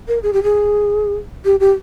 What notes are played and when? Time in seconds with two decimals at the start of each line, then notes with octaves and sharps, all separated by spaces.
0.08 A#4
0.23 G#4
0.33 G4
0.43 G#4
1.45 G4
1.60 G4